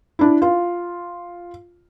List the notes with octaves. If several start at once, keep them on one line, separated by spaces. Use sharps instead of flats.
D4 E4
F4